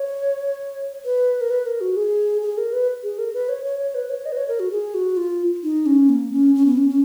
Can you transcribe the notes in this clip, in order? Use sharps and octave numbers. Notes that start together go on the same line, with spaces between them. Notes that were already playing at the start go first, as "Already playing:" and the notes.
Already playing: C#5
B4
A#4
B4
A#4
F#4
G#4
G#4
A#4
B4
G#4
A#4
B4
C#5
C#5
C#5
B4
C#5
D#5
B4
C#5
A#4
F#4
G#4
F#4
F4
D#4
C#4
A#3
C#4
C#4
B3
C#4
C#4